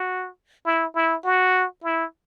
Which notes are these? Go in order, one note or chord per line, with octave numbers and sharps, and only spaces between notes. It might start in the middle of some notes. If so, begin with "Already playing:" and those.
Already playing: F#4
E4
E4
F#4
E4